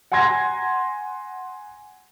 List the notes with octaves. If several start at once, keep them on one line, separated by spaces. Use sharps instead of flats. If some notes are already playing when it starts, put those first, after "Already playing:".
F#5 G#5 A#5 C6 G#6 A#6